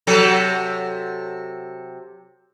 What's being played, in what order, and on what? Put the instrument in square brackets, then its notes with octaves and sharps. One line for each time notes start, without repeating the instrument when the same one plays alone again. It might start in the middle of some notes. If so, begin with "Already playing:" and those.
[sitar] C3 F#3 A4